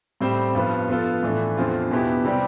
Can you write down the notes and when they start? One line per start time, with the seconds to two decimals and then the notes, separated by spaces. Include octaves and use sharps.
0.21 A2 G3 C4 G4 C5
0.55 G2 F3 B3
0.89 F3 B3 F4 A4
1.23 A2 E3 A3 D4
1.57 E2 D3 F3 C4 F4
1.91 E2 B2 B3 E4 G4
2.25 C3 G3 C4 G4 D5